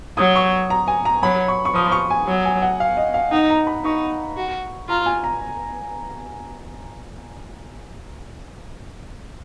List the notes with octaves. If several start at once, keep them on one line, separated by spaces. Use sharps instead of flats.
F#3 D#6
C#6
A#5
G#5
A#5
F#3 B5
C#6
C#6
F3 D#6
C#6
G#5
F#3
G#5
F#5
F5
D#5
F5
D#4 F#5
A#5
B5
D#4 C#6
F#4
F4 A#5
G#5
A#5